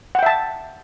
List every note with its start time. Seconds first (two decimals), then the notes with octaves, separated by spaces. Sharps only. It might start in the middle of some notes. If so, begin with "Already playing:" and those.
0.15 F#5
0.19 G5
0.23 E5
0.26 A5